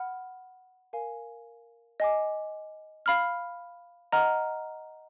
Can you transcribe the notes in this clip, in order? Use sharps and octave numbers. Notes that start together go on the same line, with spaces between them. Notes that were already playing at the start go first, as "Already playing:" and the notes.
Already playing: F#5 B5 F6
A#4 F5 G#5
D#5 G#5 D6
F5 B5 F6
D#5 F#5 A#5 F6